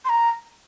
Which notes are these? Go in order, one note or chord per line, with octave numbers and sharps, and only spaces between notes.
C6
A#5